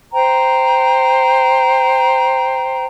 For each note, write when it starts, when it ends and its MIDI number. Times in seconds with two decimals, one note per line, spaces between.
0.13 2.86 72
0.13 2.86 79
0.13 2.86 82